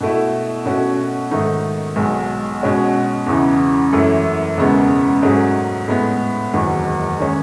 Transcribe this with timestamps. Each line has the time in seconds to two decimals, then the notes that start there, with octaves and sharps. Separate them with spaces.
0.01 B2 A3 E4
0.66 B2 A3 C#4 F#4
1.31 G#2 D#3 A3 D#4
1.96 B1 B2 G#3
2.62 B2 G#3 C#4 F#4
3.27 E2 C#3 E3
3.92 F#2 E3 A3 E4
4.57 E1 E2 C#3 G#3 B3
5.22 G#2 F#3 A3 C#4 G#4
5.88 A2 G#3 B3
6.53 F#1 E2 D#3 F#3
7.20 D#3 G#3 C#4